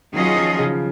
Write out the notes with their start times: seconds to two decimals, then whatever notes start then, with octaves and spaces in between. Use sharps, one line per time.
0.13 D#3 F#3 C#4 F4 G#4 D#5
0.36 F3
0.59 C#3